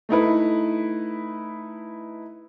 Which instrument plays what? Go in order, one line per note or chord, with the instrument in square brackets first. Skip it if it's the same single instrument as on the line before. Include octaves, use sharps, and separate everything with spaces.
[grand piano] A3 D#4 E4 B4